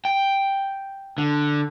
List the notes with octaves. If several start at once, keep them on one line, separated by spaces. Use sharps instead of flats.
G5
D3